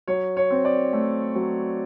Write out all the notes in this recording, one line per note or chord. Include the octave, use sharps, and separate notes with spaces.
F#3 C#5
C#5
C4
D5
A3
F#3